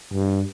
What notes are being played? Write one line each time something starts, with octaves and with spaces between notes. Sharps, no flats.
G2